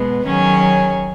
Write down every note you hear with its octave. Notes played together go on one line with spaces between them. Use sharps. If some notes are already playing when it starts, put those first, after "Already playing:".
Already playing: B2 G#3 B3
D#3 F#3 C#4 G#4 C#5